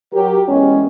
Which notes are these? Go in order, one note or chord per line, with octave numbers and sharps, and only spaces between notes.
F#3 G4 A#4
E2 G#3 C#4